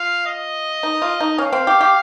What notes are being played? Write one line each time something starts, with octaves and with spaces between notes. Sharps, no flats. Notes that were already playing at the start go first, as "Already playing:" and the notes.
Already playing: F4 F5
D#5
D#4
F4
D#4
C#4 F5
C4
G4
G4